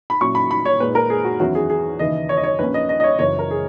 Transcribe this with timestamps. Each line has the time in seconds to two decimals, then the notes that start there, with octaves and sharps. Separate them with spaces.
0.10 B5
0.21 A#2 F#3 C#4 E4 C#6
0.35 B5
0.51 B5
0.65 C#5
0.80 A#2 G#3 D#4 B4
0.95 A#4
1.10 G#4
1.24 F#4
1.40 E2 D#3 F#3 C#4 E4 F#4
1.55 G#4
1.70 G#4
1.99 D#2 C#3 E3 D#5
2.29 C#5
2.37 D#5
2.44 C#5
2.59 A#1 A#2 A#3 C#4 B4
2.74 D#5
2.89 D#5
3.00 D#5
3.04 C#5
3.19 F#1 F#2 E3 C#5
3.39 A#4
3.51 G#4